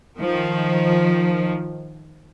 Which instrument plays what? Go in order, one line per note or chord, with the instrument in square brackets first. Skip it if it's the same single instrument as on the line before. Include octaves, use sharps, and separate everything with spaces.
[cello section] D#3 F3